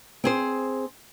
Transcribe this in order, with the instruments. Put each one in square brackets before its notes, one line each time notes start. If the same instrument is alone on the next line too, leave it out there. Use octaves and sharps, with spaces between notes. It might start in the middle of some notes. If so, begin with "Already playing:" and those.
[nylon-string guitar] C4 G#4 C5